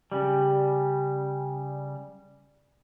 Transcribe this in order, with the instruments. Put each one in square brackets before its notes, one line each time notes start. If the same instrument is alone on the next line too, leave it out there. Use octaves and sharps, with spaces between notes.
[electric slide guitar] C#3 G3